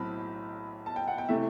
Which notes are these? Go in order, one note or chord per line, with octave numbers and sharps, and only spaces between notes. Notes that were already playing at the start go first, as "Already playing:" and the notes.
Already playing: B1 A2 F#3 C4 A5 B5
A5
G5
F#5
G5
C3 E3 A3 E5